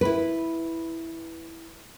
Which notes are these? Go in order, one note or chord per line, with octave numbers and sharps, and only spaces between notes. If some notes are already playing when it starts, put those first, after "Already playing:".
E4 B4